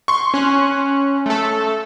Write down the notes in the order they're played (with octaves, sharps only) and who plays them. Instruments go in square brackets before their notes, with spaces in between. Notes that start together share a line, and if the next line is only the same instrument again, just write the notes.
[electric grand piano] C6 C#6
[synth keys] C#4 F#6
A3 A4